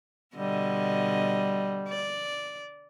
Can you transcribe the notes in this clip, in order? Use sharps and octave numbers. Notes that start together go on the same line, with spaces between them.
B2 D3 G3 D#5
D5